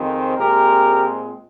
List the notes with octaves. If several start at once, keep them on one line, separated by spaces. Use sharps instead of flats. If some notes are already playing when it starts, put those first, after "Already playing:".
Already playing: F2 D#3 G#3 C4
A#2 G#3 C4 G4 A#4